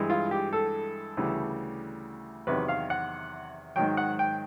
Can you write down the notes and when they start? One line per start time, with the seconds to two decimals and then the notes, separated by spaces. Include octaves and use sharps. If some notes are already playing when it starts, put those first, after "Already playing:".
Already playing: G2 E3 G#3
0.10 F4
0.31 G4
0.53 A4
1.17 D2 C#3 E3 G3
2.47 E2 C3 D#3 F#3 B4
2.68 F5
2.90 F#5
3.76 G#2 D#3 F#3 G5
3.97 F#5
4.19 G5